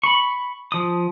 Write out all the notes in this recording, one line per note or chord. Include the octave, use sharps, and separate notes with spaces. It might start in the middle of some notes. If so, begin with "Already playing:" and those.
B5 C#6
F3 D#6